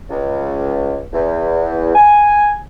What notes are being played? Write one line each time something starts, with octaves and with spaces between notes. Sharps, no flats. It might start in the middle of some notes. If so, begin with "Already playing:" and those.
C#2
E2
G#5